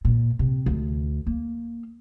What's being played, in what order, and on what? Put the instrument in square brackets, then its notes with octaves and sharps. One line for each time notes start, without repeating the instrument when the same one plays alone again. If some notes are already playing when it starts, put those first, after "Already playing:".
[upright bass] A#2
C3
D2
A#3